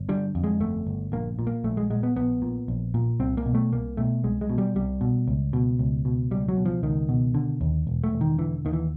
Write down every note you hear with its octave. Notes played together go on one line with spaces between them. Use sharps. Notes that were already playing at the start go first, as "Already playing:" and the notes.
Already playing: G1
D3 G3
F2
G#3
G1 A3
G1
A#1 A#3
A#2
A#3
A#1 A3
G#3
A#2 G#3
B3
A#1 B3
A#2
A#1
A#2
C2 C4
A#3
B2
A3
C2 A#3
B2 A3
C2 G#3
G#3
B2
G3
C2 G3
B2
C#2
B2
C#2
B2
C#2 G3
F#3
B2
F3
C#2 D#3
B2
D3
D#2
E1
A3
E1
D#3
D3 E3
D#2 D#3
E3